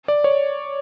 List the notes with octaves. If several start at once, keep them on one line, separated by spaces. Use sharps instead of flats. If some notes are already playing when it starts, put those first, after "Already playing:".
D5
C#5